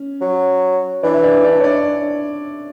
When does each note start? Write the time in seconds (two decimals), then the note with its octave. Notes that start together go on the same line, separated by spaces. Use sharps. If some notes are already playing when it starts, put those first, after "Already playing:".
Already playing: C#4
0.21 F#3
1.03 E3 D4 D5
1.14 E5
1.23 D4 D5
1.44 D4 D5
1.60 C#5
1.64 D4 D5